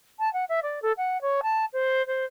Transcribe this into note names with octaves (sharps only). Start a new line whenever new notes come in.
A5
F#5
E5
D5
A4
F#5
C#5
A5
C5
C5